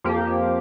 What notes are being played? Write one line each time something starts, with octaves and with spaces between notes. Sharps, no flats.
F2 F3 A#3 G4